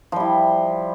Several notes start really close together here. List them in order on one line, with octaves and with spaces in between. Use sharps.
F3 G3 E4